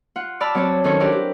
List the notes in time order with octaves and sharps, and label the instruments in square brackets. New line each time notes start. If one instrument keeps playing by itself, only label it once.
[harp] F4 F#5
D5 A5 B5 E6 F6
F#3 C4 C#5 D5 A5
D#3 C#4 A4 C5 C#5
D4 E4 F#4 G4 A#4 D5
G4